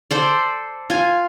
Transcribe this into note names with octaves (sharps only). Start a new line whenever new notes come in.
A4 C5 D5
F4 G#5